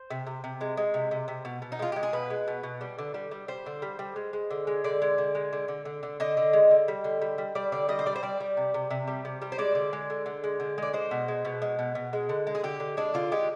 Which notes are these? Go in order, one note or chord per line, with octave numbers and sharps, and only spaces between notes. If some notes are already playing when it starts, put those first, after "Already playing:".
Already playing: C5
C3
C3
C3
G#3
G#3
C3
C3
C3
B2
B2
D#4
G#3 F4
G#3 G4
G#4
B2 B4
G#3
B2
B2
G3
D3
G3
G3
G3 C5
D3
G3
G3
G#3
G#3
D3
G#3
D3 D5
G#3
D3
G#3
D3
D3
D3
D3
D3 D#5
D3
G#3
D3
G3
D3
G3
G3
G3 D5
D3 D5
G3 D#5
C5
G3 D5
C5
G3 D5
G3
C3
C3
C3
G3
C3
G3
C5
G#3 D5
D3
G#3
D3
D3
G#3
D3
G#3 D5
G#3 C5
B2
G#3
B2
G#3
B2
B2
G#3
D3
G#3
G#4
D3 G4
D3
G#3 D4
D3 F4
G#3 G4